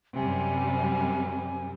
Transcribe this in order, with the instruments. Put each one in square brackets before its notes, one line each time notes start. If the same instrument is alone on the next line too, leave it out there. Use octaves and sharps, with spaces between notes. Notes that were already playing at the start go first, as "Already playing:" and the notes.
[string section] F#2 C3 G3 [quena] G#5